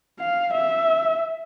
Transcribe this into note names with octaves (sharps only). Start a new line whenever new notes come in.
F5
E5